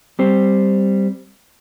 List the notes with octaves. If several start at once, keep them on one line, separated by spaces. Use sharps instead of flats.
G3 C4 C5